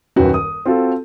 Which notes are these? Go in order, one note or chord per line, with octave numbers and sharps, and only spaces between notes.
D#1 F#2 F#4 B4 G5
D#6
C4 F4 F#4 A4